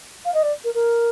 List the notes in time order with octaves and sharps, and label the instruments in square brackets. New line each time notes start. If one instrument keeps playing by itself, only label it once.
[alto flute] F5
D#5
D5
A#4
A#4